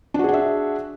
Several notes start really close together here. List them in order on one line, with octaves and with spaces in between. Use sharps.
D4 F#4 G#4 F#5 E5